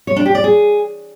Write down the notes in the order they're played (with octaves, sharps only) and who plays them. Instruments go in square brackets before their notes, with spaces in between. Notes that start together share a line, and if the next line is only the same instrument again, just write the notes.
[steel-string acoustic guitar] C#5
D4
G4
D5
G#4